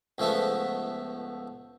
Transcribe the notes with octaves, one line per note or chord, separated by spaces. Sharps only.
C#2 F3 A3 B3